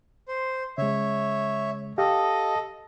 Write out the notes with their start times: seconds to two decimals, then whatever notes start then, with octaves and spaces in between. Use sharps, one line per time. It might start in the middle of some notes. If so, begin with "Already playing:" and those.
0.28 C5
0.78 C#3 G#3 C#5 E5
1.98 G4 A4 D#5 F5